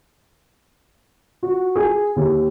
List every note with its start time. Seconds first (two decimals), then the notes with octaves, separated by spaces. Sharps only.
1.43 F#4
1.76 G#4
2.16 D#2